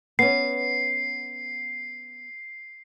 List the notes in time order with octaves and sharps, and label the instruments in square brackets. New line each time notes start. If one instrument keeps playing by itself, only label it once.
[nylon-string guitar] B3 C#4 [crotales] C7